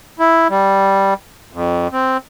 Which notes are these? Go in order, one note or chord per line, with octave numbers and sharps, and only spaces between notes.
E4
G3
F2
C4